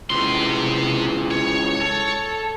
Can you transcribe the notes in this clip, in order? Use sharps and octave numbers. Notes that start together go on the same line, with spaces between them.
C#2 C3 E3 C6
C#5
A4